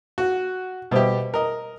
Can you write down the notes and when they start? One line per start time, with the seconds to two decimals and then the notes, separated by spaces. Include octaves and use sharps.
0.18 F#4
0.91 B2 G3 G4 C5 E5
1.34 A#4 D#5